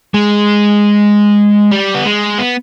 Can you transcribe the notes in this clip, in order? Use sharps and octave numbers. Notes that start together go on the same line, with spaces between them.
G#3
G3
B3
G#3
B3